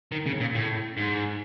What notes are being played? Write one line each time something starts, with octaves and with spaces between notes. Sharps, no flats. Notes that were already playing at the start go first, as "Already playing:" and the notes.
D#3
C#3
A#2
A2
G#2